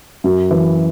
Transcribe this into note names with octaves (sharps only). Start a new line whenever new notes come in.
F#2
E3